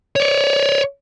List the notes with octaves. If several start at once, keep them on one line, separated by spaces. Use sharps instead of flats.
C#5 D5